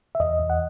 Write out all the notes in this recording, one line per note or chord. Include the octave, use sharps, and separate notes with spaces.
E5
E2 D#5
E2
F#5